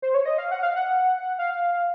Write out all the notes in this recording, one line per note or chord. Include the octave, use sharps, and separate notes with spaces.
C5
C#5
D#5
F5
F#5
F5
F#5
F5